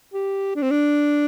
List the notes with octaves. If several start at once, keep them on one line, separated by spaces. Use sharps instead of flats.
G4
D4
C4
D4